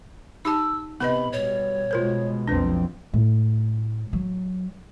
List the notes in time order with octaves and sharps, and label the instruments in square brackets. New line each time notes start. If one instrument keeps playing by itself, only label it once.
[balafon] D#4 G4 A5 [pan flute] E6
[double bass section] C3 [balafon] B3 B4 D#5 [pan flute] B5
[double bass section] B2 G3 [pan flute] C#5
[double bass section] B2 G#3 [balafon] F4 A#4 C5
[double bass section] B1 F2 C4 [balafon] D4 B4
[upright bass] A2
F#3